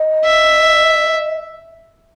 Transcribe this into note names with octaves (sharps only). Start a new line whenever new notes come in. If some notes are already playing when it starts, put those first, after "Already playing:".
Already playing: D#5
E5